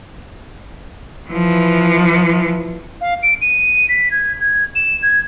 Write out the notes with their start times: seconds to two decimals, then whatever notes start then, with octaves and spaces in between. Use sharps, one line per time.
1.30 E3 F3
3.01 F5
3.23 D7
3.41 D#7
3.89 B6
4.11 G#6
4.41 G#6
4.75 E7
5.02 G#6